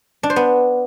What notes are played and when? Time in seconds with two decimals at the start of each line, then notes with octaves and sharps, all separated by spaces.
0.23 D4
0.30 C5
0.36 B3